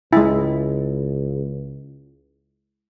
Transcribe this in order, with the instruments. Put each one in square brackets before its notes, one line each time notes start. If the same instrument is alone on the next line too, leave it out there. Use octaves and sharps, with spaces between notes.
[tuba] C#2 [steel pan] G#3 E4